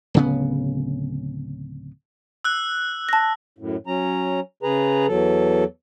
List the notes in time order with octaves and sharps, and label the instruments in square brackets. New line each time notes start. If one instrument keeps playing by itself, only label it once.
[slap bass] D1 C#3 B3
[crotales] E6 F#6
[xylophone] A5 A#6
[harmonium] F#2 A2
F#3 C#4 A#5
C#3 G#4 B4 A#5
E2 F#3 A4